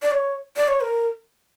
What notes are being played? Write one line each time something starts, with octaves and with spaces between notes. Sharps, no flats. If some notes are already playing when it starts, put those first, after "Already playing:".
D5
C#5
D5
C#5
A#4